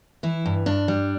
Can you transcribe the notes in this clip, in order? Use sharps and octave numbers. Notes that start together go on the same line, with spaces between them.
E3 E4
G2
G2 D4
G3